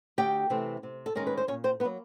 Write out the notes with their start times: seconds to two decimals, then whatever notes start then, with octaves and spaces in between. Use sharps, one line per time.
0.18 D2 G4 G5
0.50 C3 E3 A3 C4
0.83 C3
1.06 A4
1.15 D#3 G#3 C#4 A#4
1.27 B4
1.37 C5
1.48 A#2 C#4 C#5
1.64 C4 C5
1.80 A#3 B3 B4
1.85 F#3